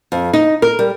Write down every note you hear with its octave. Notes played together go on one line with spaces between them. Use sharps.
F2
D#4
A#4
G3